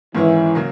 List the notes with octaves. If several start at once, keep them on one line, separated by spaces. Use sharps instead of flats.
G#2 D#3 E3 G#3 C#4 E4
C#3 F#3 A#3